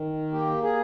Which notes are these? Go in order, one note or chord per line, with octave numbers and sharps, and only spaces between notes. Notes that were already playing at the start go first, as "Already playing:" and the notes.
Already playing: D#3
A#3 G4
G#4